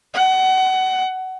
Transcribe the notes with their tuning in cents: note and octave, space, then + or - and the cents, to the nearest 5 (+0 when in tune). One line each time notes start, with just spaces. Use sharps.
F#5 +25